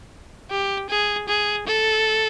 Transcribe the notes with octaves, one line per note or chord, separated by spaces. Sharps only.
G4
G#4
G#4
A4